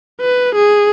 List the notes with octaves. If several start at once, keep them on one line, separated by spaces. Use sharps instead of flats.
B4
G#4